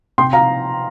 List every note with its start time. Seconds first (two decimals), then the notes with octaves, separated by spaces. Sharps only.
0.18 C3 G5 C6
0.33 F5 A#5